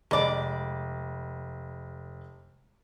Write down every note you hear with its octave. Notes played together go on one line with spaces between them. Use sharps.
F1 G#3 D5 B5